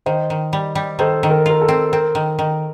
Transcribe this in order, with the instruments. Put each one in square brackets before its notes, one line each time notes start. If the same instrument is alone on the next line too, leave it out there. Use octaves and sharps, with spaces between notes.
[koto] D#3 [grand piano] C5 D#5
[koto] D#3
G3
G3
[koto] D#3 [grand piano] A4 C5
[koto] D#3
[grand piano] A#4
[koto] F4 [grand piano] A#4
[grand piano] A4
[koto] C4
[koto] C4 [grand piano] A#4
[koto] D#3
D#3